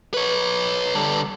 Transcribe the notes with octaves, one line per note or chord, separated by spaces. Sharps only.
B4 C#5
D3 G3